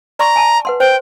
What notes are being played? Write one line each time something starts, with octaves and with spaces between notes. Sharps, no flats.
D5 A#5 C6 C#6
G#5 A5
B4 F#5 C6
C5 G5